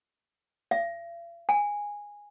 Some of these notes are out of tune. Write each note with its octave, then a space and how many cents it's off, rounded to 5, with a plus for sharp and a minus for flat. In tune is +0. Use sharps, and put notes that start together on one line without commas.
F5 -45
G#5 -10